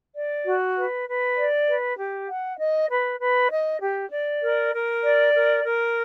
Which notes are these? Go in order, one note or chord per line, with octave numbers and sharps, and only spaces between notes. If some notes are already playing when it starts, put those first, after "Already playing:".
D5
F#4
B4
B4
D5
B4
G4
F#5
D#5
B4
B4
D#5
G4
D5
A#4
A#4
D5
A#4
A#4